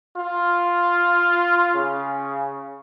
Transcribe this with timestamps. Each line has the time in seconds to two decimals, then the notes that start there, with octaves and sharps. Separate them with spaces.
0.18 F4
1.75 C#3